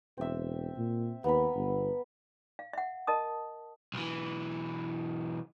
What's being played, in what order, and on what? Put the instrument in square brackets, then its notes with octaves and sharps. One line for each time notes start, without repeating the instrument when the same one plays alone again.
[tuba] E1 [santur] C4 E5
[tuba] A#2
[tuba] D#2 [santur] B3 A#5 B5
[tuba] G1
[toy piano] F5
E5 F#5
A#4 D#5 A5 D#6
[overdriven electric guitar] B1 E3